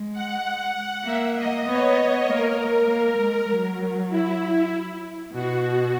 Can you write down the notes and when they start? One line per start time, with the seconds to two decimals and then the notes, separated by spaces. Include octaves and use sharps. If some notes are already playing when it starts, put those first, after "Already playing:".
Already playing: G#3
0.13 F#5
0.44 F#5
1.04 A#3 E5
1.35 D#5
1.66 B3 C#5
2.26 A#3 A#4
2.87 A#3
3.18 G#3
3.49 F#3
4.09 E4
5.32 B2 F#4